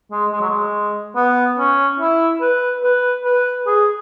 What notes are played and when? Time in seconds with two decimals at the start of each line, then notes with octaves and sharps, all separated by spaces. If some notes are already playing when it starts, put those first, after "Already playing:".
0.11 G#3
0.32 G#3
0.40 F#3
0.49 G#3
1.16 B3
1.58 C#4
2.00 E4
2.41 B4
2.83 B4
3.25 B4
3.67 G#4